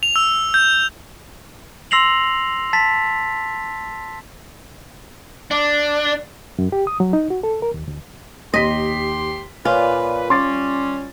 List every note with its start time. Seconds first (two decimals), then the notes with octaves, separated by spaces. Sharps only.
0.03 F7
0.16 E6
0.54 G6
1.91 C6 E6 A#6 C7 F7 F#7
2.73 A5 A6 B6
5.51 D4
6.59 F#2
6.72 G4
6.87 D#6
7.00 F#3
7.13 D#4
7.30 F#4
7.43 A4
7.62 A#4
7.74 D#2
7.88 D2
8.54 D#2 G4 D#5 C6 B6
9.65 A#2 F4 B4 C#5 D5 G#5
10.30 G3 C#4 C6 D6 A6